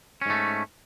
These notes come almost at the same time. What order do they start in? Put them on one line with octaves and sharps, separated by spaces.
C#4 G#2 A3